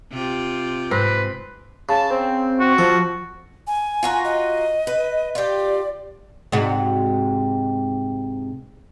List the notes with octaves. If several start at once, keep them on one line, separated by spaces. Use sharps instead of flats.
C3 F4 G4
G#2 C4 B4
C#3 A5
C4
F#4
F3 A4
G#5
F4 F#4 A#4
D#5
B4
F4 G4 D5
G#2 C3 F#4